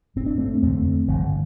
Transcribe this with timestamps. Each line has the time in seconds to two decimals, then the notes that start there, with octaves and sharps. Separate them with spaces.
0.16 G1 C4
0.26 D4
0.38 A3 C4
0.63 F2 D3 A3 C4
1.07 G1 D3 F3